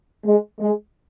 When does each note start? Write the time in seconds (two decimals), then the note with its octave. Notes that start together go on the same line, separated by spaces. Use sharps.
0.25 G#3
0.60 G#3